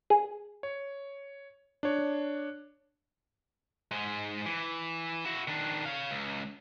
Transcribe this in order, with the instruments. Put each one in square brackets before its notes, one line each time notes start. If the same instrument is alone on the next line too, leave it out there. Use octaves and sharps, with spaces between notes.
[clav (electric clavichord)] G#4
[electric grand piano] C#5
D4 C#5
[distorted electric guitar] G#2 G#3
E3
E4 F#4
D#3 D4
C#5 F5
C#2